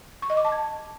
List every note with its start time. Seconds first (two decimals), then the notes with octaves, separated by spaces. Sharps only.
0.22 C#6
0.30 D#5
0.37 D6
0.45 A5
0.52 G#6